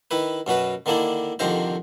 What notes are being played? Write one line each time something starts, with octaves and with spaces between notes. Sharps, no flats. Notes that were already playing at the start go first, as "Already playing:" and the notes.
D#3 E4 B4
F#2 B2 F#4 B4
D3 D#3 A#3 D4 E4
C2 F2 D3 D#3 C5 A#5